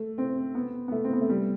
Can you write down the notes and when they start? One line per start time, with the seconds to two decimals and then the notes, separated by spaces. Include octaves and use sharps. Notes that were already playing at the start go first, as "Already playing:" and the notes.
Already playing: A3
0.18 C4
0.55 B3
0.88 B3
0.92 A3
1.04 C4
1.13 B3
1.21 A3
1.29 G3